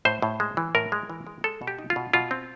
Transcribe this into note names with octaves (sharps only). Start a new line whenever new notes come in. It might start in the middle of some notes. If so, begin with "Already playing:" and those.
A2 C5
A2
G#3
E3
A2 A#4
G#3
E3
G#3
G#3 A4
B2
G4
D#4
F4
B2
B2 F4
C4